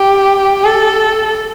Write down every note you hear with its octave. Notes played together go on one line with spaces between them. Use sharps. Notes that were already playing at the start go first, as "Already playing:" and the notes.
Already playing: G4
A4